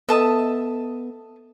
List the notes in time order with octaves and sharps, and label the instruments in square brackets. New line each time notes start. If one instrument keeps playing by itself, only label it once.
[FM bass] B3 [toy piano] A4 D#5 [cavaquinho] E5 A5 D#6